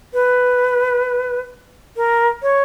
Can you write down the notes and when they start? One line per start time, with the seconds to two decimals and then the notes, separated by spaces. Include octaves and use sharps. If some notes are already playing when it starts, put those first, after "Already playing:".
0.14 B4
1.97 A#4
2.42 C#5